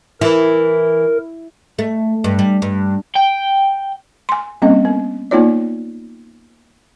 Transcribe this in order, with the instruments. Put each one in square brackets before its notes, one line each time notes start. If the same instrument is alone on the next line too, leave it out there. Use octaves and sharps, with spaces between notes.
[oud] E3 [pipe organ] A#4
[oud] A3
G2
G3
G2
[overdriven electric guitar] G5
[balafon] G#5 C6
G3 A#3 C4 C#4 D#5
B3
A#3 B3 D#4 F4 C#5 D5